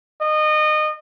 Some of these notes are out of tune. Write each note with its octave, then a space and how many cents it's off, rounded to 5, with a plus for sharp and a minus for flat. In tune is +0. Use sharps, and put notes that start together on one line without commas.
D#5 -25